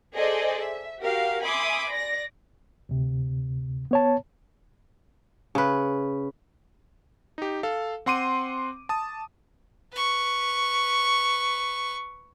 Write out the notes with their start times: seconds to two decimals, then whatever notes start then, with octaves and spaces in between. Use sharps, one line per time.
0.15 G#4 A4 C5 D5 D#5
0.59 E5
0.99 F#4 G4 A#4 F5
1.42 E5 G#5 B5 C6 D6 D#6
1.90 D5 A#6
2.89 D2 C3
3.91 B3 C#5 A5
5.55 C#3 B4
7.38 D#4 G4
7.63 A4 F5
8.06 C4 F#5 C6 D6 D#7
8.89 A5 D#6
9.93 B4 C#6